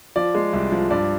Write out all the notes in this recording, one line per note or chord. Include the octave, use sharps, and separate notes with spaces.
F3 D5
G#3
C2
F3
G2 D5